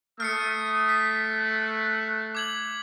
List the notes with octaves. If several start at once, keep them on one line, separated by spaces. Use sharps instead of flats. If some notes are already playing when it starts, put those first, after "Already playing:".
A3 D#6 F6 C7 C#7
B6
F#6
D6 G#6 F#7